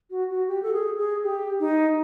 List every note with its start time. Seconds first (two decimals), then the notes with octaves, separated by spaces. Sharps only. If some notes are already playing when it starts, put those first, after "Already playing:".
0.11 F#4
0.30 F#4
0.48 G4
0.63 A4
0.73 G#4
0.98 G#4
1.23 G4
1.60 D#4